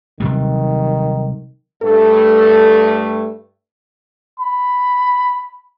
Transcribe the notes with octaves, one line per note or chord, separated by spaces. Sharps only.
C3 D#3 F#3 G3
G2 A3 A4
B5